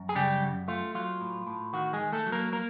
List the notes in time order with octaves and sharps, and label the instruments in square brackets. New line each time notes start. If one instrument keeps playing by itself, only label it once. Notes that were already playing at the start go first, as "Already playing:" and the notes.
Already playing: [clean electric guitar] F#2
G#4
C#3 G3 G4
F#2
A3 F4
F#3 F4
A2
A2
D#3 F#4
G#3 G#4
D#3
A3 A4
F#3
A#3 A#4
A#3 A#4